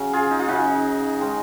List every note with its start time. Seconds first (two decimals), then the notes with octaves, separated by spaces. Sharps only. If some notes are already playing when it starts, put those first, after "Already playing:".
Already playing: C#3 F#3 C#4
0.13 F4 G#4
0.31 D#4
0.39 F4
0.48 C#3 F#3 C#4 D#4 F#4
1.19 D#3 G#3 C#4